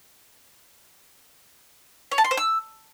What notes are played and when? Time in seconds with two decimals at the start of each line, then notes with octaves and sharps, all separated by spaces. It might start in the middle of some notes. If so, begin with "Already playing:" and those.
2.11 C#5
2.18 A5
2.24 C6
2.31 C5
2.37 E6